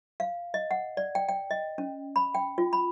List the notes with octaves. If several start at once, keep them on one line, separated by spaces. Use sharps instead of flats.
F5
D#5
F#5
D5
G5
G5
D#5
C#4
B5
G5
F4
B5